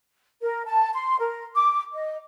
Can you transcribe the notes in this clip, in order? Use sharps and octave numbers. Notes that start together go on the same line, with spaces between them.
A#4
A5
C6
A#4
D6
D#5